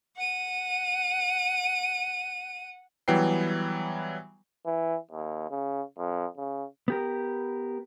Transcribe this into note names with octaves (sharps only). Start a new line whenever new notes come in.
F#5 D#7
E3 F#3 G3 B3 G5 C7
E3
D#2
C#3
F2
C#3
B3 G4 A#4